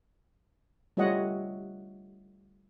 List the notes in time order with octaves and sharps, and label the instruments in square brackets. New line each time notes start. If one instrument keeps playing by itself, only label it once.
[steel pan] G3 A3 F4 C#5 D#5 F#5